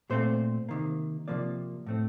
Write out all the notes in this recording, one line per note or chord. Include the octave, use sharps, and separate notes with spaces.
A#2 A3 C4 C5
C3 D#3 A#3
C3 F3 A#3 D5
A2 A3 C4